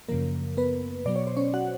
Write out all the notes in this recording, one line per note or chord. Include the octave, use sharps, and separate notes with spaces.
F#2 C#3 F3 A#3 A#4
B3 B4
B2 F#3 B3 D5
C#5
C5
C#4 C#5
F#4 F#5